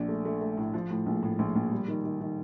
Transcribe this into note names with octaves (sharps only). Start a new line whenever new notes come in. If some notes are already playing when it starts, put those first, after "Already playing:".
Already playing: A#1 D4
A3
A3
A3
A2
F3
A2
A#1
A2
A#1
A#1
G3
D#3
D#3
D#3